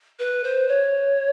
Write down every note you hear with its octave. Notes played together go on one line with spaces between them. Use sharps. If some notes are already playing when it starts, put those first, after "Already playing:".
B4
C5
C#5